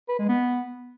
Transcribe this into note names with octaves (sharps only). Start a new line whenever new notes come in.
B4
G#3
B3